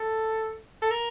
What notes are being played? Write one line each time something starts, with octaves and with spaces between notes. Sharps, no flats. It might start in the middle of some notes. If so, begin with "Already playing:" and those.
Already playing: A4
A4
A#4